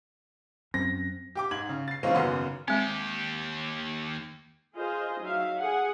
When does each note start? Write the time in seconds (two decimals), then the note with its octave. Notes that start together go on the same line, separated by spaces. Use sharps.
0.74 F#2 C4 A#6
1.35 G4 G5 D6
1.51 G#2 G#6 F#7
1.69 C#3
1.88 A6 C7
2.03 E3 G#3 A#3 C4 C#4 F4
2.15 G#1 F#2 C#3 B3 C6
2.68 D#2 G#3 C4 G4
4.75 F4 G#4 C5 D#5
5.21 F#3 D#4 E5 F5
5.59 G#4 F#5